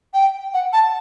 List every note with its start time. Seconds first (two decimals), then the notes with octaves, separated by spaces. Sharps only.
0.13 G5
0.53 F#5
0.73 A5